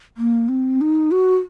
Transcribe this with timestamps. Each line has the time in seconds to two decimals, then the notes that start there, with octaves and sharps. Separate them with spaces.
0.17 A#3
0.49 C4
0.81 D#4
1.11 F#4